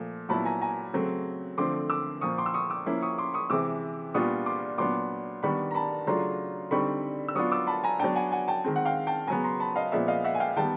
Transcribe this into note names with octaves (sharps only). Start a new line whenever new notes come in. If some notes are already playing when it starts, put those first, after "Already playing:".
Already playing: A#2 F3 A3
A#2 F#3 B3 E4 A5 B5
G#5 A#5
G#5 A#5
C#3 F#3 A3 C4
D3 F3 A3 C4 C6 D6
D6 E6
A#2 F3 A#3 C#6 D#6
C6 D6
E6
C#6 D#6
D6 E6
F3 A#3 C#4 E4
C#6 D#6
C6 D6
C#6 D#6
C3 E3 G#3 D6 E6
A#2 G3 B3 D4 F4 C#6 D#6
C6 D6
A#2 F#3 B3 D4 C6 D6
D#3 G3 B3 D4 B5 C#6
A#5
A5 B5
C#3 F#3 A3 D4 F4 A#5 C6
D3 G3 C4 D#4 B5 C#6
E6
F#3 B3 D4 F4 C#6 D#6
D6 E6
A5 B5
G#5 A#5
F#3 B3 D4 G5 A5
F#5 G#5
F#5 G#5
G5 A5
D#3 G#3 C4
F#5
F5 G5
G5 A5
C#3 F#3 B3 G#5 A#5
A#5 C6
A5 B5
D#5 F5
A#2 F3 G#3 B3 D5 E5
D#5 F5
E5 F#5
G#5
F5 G5
D#3 G3 B3 G5 A5